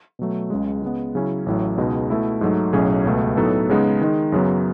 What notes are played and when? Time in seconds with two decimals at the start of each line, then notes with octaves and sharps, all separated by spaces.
0.19 B2 F#3 A3
0.50 C#2 C#3 G#3
0.82 C#3 G#3 B3
1.15 C#3 F#3 C#4 E4
1.46 A1 A2 F#3
1.78 C#2 B2 G#3 D#4
2.10 B2 A3 E4
2.41 G#2 F#3 A3 D#4
2.73 B1 A2 F#3 C#4 G#4
3.05 C#2 B2 A3
3.37 A2 F#3 B3 D#4 A4
3.69 C#3 G#3 B3 D#4
4.01 D#3 G#3 D#4
4.32 F#2 C#3 F#3 B3